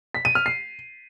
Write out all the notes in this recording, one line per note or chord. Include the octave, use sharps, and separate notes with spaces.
B6
D#7
F6
C7